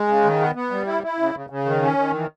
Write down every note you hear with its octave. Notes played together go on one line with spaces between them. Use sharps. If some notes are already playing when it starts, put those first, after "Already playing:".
Already playing: G#3
C#3
D#3
B3
B3
G3
E4
E4
C#3
C#3
C#3
D#3
C#4
D#3
E3